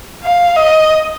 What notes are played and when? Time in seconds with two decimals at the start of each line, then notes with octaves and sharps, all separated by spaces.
0.23 F5
0.56 D#5